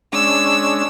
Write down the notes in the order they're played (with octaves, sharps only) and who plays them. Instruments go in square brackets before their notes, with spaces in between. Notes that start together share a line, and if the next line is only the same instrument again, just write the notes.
[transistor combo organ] G#3 C#4 D4 [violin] E6